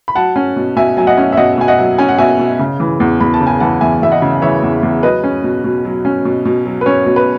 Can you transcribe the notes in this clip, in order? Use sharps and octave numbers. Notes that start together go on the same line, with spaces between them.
B5
F#3 F#5 A5
C#4
B2
B2 E5 G#5
F#3 G#5
D#5 F#5
C#4
E5
B2 D#5 F#5
B2 G#5
D#5 F#5
F#3
C#4 G#5
F#5
B2 E5 G#5
B2
C#3
E3
E2
E2 B5
A5
C#3
G#5
E3 F#5 A5
E2 E5 G#5
E2 E5
D#5 F#5
C#3
E3 C#5 E5
E2
E2
F#3 B4 D#5
C#4
B2
B2
F#3
C#4
B2
B2
F#3
B4
C#4 C#5
B2
B4